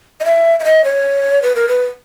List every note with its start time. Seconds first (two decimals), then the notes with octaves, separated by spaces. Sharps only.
0.20 D#5
0.25 E5
0.60 E5
0.64 D#5
0.84 C#5
1.42 B4
1.55 A#4
1.69 B4